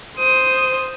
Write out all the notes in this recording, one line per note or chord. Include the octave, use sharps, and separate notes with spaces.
C5 D#6